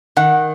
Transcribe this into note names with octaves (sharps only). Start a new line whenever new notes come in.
D#3 F#5